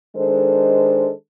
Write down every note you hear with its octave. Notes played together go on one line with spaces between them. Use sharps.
D#3 G#3 D4 A4 C5